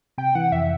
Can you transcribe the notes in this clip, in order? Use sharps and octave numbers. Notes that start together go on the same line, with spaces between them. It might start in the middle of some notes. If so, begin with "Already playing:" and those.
C3 G5
E3 F#5
F2 E5